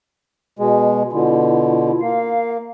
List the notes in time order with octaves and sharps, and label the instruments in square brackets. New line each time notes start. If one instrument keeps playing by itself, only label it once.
[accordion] B2 G#3
[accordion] B2 D3 [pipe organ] E4 F4
[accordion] A#3 [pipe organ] F5